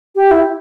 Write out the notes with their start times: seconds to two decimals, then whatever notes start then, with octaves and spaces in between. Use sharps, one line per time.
0.16 G4
0.31 E4